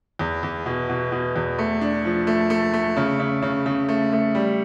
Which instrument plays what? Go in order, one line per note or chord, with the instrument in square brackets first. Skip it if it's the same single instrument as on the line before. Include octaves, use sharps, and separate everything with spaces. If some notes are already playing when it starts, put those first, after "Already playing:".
[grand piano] E2
E2
B2
B2
B2
E2
A3
D4
F3
A3
A3
A3
C#3
C#3
C#3
C#3
A3
A3
G3